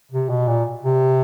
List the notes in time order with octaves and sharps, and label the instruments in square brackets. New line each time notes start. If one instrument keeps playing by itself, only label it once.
[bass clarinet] C3
B2
A#2
C3